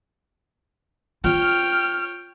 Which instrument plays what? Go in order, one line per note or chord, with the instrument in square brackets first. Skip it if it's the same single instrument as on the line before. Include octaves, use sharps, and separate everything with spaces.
[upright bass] F4 [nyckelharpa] C#5 G5 [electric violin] F6